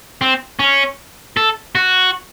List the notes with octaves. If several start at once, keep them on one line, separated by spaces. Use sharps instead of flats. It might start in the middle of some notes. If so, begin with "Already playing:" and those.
C4
C#4
A4
F#4